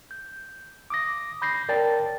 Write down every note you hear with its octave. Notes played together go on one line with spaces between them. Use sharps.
G6
D6 D#6 A#6
B5 G6 A#6 C7
A#4 C#5 D5 G5 A5 A6